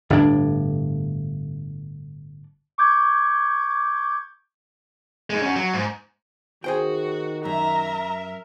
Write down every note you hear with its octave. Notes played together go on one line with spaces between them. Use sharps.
G1 A2 D4
C#6 D6 G6 G#6
G#3 D#4
C#4 F#4
F#3
G#2
D#3 F#4 G#4 C5 G5
F#2 A#4 E5 A#5